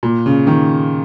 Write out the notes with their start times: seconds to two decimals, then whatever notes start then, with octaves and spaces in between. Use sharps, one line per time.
0.03 A#2
0.26 C#3
0.47 D#3